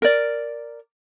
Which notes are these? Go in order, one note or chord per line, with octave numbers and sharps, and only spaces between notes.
A#4 D5